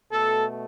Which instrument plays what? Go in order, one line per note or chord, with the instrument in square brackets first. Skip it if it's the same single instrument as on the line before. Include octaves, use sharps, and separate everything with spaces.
[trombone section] B2 A3 A4